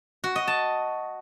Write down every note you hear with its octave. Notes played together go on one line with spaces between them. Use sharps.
F#4
D#5
A5